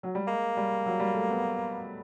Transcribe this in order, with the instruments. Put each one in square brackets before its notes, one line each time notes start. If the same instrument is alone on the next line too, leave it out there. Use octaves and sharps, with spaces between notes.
[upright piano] F#3
G3
[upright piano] G#3 [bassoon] A#3
[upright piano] G3
F#3
G3
A3
B3